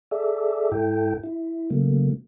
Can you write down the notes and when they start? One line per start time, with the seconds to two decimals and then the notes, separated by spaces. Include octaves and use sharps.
0.11 G#4 A4 D5 E5
0.72 G#2 E4 A4 G5
1.23 E4
1.70 C#3 F#3 A3 A#3